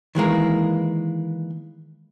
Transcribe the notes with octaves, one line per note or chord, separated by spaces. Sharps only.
D#3 E3 G#3 A#3